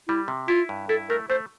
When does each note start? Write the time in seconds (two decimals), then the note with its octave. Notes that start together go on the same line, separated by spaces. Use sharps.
0.08 G3 E4
0.28 C3
0.48 E4 F4
0.69 G2
0.89 E4 A4
1.10 A3 A#4
1.30 A3 C5